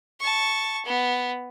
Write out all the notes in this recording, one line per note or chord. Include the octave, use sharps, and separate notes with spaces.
A5 C#6
B3